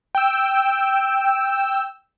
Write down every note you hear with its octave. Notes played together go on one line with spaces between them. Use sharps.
G5 E6